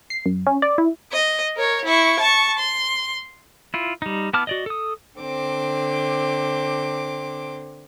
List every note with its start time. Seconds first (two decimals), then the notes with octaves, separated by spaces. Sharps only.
0.10 C7
0.26 F#2
0.47 C#4
0.62 D5
0.78 E4
1.13 D#5
1.56 A#4 C#5
1.85 E4 C#6
2.20 A5 C#6
2.59 C6
3.74 E4 F4
4.02 G3 D#4
4.34 B3 E4 A5 D6 F6
4.47 F#4 D5 D#5
4.66 A4 D#6
5.19 D3 C4 D6